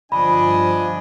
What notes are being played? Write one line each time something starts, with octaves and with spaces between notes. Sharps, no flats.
G1 F3 D4 D#5 G#5 B5